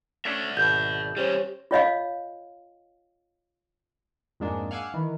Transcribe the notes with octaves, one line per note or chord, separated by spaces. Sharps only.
A3 C#4 D4 D5 E5
G#1 B2 G6
G3 C#4 G4 C5 C#5
F4 C#5 D#5 F5
F2 G#2 G#3 A#3 D4
F5 F#5 G#5 D6 E6
D#3 E3